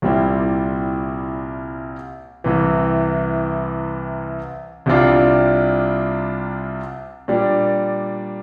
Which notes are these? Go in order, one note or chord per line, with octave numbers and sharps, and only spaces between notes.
C2 A#2 G3 C4 E4
C2 C3 E3
C2 C3 G3 D4 F4
A#2 G3 D4